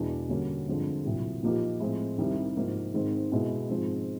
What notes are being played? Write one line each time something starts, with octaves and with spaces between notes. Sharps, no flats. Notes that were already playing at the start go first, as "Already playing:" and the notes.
Already playing: E2 B2 G#3 B3 D4
D3 G3 A#3 C#4 F#4
G2 D3 F3 G#3 C4
C2 A#2 F#3
A#2 F3 A#3 D#4 G4
A2 F3 G#3 C4
C2 C3 D#3 G3
G#2 F3 A#3
G#2 D#3 G#3 C4
B2 G#3 B3 E4
G#2 F3 G#3 C4